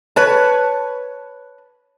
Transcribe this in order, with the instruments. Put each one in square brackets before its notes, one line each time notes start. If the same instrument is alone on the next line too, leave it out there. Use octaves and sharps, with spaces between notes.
[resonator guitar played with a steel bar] B4 C#5 A5